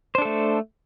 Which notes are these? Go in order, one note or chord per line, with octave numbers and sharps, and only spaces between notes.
A3 D4 A4 C5